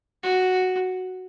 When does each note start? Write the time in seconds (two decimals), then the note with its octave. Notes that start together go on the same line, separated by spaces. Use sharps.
0.23 F#4